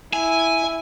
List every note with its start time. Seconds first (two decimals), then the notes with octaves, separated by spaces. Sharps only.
0.13 E4 G#5